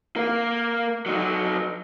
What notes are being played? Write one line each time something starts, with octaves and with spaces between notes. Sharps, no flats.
A#3 A#4
F#3 D#4